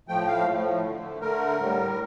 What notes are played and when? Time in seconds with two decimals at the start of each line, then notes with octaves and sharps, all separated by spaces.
0.08 A2 F3 A3 G5
0.27 F5
0.46 A2 F3 A3
0.84 D3 A3
1.21 D3 A3 A#4
1.59 A2 G3